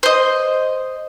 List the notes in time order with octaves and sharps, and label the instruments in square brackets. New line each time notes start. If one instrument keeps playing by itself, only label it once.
[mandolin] C5 D#5